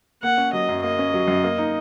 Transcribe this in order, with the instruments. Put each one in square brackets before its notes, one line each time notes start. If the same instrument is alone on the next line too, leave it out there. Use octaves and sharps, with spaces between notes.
[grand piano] A#3 [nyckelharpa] F#5
[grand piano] C#4
[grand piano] F#3 [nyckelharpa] D#5
[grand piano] F#2
[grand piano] A#3 [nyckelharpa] D#5
[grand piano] C#4
F#3
F#2
A#3
D#4